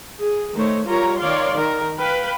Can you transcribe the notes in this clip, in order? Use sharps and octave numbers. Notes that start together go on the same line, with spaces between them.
G#4
D#3 A3 C5 C#5
G3 F4 G4 A#4 C#5 A#5
D#3 C#5 D5 F5 C6
D#3 A#4
B4 F5 G5 B5